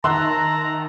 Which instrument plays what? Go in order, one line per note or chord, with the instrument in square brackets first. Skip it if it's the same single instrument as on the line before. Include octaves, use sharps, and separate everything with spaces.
[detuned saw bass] D#3 [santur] E5 F#5 [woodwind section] A5 A#5 [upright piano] C6